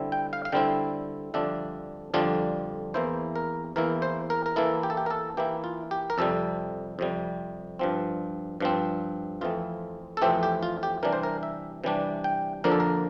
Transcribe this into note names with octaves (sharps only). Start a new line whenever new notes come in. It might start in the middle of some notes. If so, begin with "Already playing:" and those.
Already playing: D3 G3 C4 E4
G5
F5
F5
D3 G3 C4 E4 G5
F2 D3 G3 D4 F4 E5
F2 D3 G3 D4 F4
E2 E3 A#3 E4 C5
A#4
E2 E3 A#3 E4 A#4
C5
A#4
A#4
E3 A#3 E4 A4
G4
A4
G4
A#4
A4
E3 A#3 E4 G4
F4
G4
A#4
F2 C3 G3 A4
F2 C3 G3
G2 F3 C4
G2 F3 C4
F2 E3 A3 C4 F4
A4
F2 E3 A3 C4 G4
G4
F4
G4
C3 E3 G3 D4 A#4
C5
A#4
E5
C3 E3 G3 D4
G5
F2 D3 F3 A#3 D4 A#4
A4
A#4